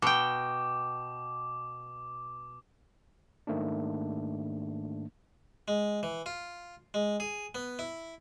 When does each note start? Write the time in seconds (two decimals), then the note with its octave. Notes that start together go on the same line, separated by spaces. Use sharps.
0.02 B2 G5 D6
3.47 G#2 D#3 A3 A#3 D4
5.68 G#3
6.03 E3
6.26 F4
6.94 G#3
7.20 G#4
7.55 B3
7.79 E4